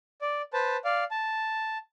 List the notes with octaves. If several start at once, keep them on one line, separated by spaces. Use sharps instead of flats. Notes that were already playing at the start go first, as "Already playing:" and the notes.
D5
B4 C5 A5
D5 F5
A5